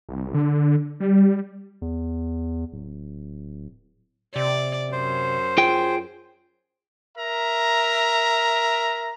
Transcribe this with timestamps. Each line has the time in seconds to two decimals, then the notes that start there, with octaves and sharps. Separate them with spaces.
0.09 C2
0.34 D3
1.00 G3
1.82 E2
2.72 D1
4.36 C3 D5
4.92 F#2 C5
5.58 F4 G#4 G5
7.17 A#4 E5 A#5